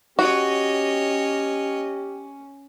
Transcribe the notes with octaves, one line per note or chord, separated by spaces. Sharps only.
C#4 F#4 G4 C#5 D#5